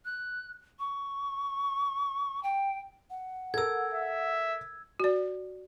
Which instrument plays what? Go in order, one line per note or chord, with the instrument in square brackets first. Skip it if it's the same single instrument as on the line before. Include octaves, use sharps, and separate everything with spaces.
[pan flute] F#6
C#6
G5
[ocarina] F#5
[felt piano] A4 A#4 [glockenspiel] E6 G#6
[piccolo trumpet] E5
[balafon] F#4 D5